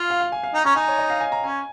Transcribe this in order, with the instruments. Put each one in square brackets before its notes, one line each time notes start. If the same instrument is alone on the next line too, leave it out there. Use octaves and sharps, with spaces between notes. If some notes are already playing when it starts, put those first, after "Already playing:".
Already playing: [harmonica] F4 [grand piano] F5
[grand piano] F5
F5
G#5
F5
[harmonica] D#4
[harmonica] C#4 [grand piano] A#5
[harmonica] D#4 [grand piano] G#5
[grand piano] C#5
D#5
F5
G#5
A#5
[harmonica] C#4 [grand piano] G#5